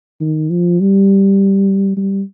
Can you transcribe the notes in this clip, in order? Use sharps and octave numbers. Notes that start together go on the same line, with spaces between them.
D#3
F3
G3
G3